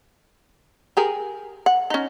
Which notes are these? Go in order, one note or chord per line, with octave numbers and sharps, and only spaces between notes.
G4 G#4 A#4
F#5
C#4 D#4